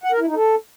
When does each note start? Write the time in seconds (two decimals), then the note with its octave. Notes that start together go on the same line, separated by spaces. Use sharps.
0.04 F#5
0.12 A#4
0.20 E4
0.28 D#4
0.36 A4